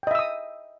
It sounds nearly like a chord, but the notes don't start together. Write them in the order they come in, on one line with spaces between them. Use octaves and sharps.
G5 D#5 E5 E6 D#6